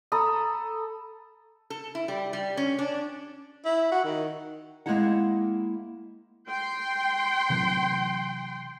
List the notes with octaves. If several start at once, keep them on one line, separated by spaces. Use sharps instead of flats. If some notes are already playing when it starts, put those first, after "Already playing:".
A4 A#5 B5 D#6
A4
E4
G3
G3
C#4
D4
E4
F#4
D#3
G#3 A#3 C4 E4 F#5
G5 C6
C3 E3 F#3